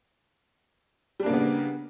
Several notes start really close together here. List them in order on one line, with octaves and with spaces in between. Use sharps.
G3 D4 A#3 C#3 B3